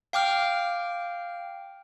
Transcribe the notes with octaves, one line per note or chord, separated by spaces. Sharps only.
F5 G5 D6 F6